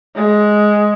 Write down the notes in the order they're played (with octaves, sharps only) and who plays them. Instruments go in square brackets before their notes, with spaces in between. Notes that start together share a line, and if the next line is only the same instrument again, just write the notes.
[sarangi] G#3